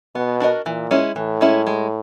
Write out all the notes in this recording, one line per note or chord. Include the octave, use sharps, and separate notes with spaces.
B2 B3
D4 F#4 A#4 D#5
A#2 E3
G#3 C#4 E4
A2 E3
G#3 C#4 E4
G#3